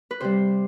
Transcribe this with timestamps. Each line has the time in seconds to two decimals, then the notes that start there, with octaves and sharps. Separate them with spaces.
0.11 B4
0.21 C3 G3 C5